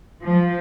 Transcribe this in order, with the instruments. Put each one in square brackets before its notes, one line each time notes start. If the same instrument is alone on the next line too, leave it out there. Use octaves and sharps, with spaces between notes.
[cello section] F3